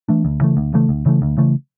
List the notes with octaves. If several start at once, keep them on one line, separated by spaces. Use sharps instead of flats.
E3 A3 D4
D2
C#3 E3 A3
D2
C#3 E3 A3
D2
C#3 E3 A3
D2
C#3 E3 A3